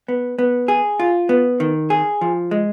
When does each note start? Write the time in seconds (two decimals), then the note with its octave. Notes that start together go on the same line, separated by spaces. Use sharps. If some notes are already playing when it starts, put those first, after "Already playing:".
0.08 B3
0.39 B3
0.68 G#4
0.99 F4
1.29 B3
1.60 D#3
1.90 G#4
2.21 F3
2.51 G#3